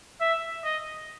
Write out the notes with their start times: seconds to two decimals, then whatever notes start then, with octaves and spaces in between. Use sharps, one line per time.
0.21 E5
0.64 D#5